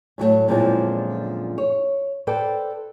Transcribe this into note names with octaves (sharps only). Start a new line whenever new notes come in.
A2 F#3 G3 A3
F#2 A#2 D3 F3 G#3 C4
C#5
A4 B4 C5 D5 G5